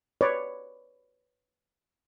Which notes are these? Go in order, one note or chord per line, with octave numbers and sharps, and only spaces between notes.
B4 C#5 D5